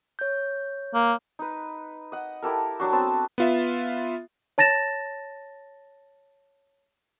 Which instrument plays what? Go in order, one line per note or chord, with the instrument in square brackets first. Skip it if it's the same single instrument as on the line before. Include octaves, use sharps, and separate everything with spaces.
[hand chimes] C#5 G6
[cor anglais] A#3
[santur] D#4 B4
D#5 F#5
E4 G4 A4 A#4
F#3 D4 F#4
B3 C4 A5
[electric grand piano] B3 F4 E5
[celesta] C#5 A5 A6 A#6 E7